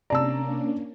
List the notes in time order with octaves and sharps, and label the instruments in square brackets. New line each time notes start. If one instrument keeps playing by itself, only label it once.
[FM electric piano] C3 A#5 [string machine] A#3 C#4 D4 [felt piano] D5 A5 E6